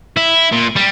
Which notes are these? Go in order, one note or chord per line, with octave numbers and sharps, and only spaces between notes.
E4
A#2
G3